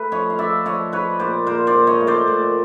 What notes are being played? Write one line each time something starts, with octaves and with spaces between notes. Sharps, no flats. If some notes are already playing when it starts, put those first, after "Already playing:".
Already playing: A3 B4
F3 C#5 D#5
F5
F3 D5 E5
F3 C#5 D#5
F3 B4 C#5
A#2 C5 D5
A#2 A#4 C5
C5 D5
A#2
C#5 D#5
A3
C5 D5
A#2